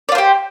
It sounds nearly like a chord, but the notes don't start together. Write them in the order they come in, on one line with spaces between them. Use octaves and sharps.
D5 F4 C5 G4